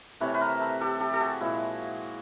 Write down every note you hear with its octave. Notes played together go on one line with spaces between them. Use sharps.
C3 E3 A3 B4 C#5
B4
A#4 C5
A4 B4
G4 A4
G4 A4
A4
F#4 G#4
A#2 F3 G#3 E4 F#4